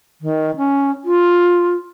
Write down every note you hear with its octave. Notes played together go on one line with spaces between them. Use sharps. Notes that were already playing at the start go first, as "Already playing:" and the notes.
D#3
C#4
F4